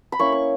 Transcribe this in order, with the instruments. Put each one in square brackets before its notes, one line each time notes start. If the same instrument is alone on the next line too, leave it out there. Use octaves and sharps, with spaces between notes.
[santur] B5
A#3 C#4 E4 C#6
C#6